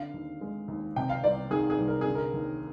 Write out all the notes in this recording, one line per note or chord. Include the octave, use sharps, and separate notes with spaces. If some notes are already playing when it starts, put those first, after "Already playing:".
Already playing: D3 F5
D#2
G#3
D#2
C3 G5
F5
C2 D5
D#3 G#4
G#4
C2
A#4
D3 G#4
A#4
D#2